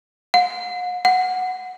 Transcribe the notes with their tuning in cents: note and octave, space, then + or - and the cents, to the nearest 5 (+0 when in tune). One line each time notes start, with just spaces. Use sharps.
F#5 -45
F#5 -5